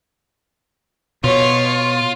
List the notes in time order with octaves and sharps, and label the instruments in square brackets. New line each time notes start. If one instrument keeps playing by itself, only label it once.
[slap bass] B2 [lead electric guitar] F4 [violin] C#5